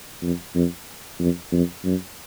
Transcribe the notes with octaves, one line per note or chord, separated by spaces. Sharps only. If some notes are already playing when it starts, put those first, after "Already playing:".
F2
F2
F2
F2
F#2